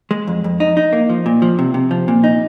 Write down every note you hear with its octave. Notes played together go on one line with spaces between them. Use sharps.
G#3
F2
F2
D#4
D#4
A#3
F3
A#2
F3
C3
C3
F3
A#2
D#4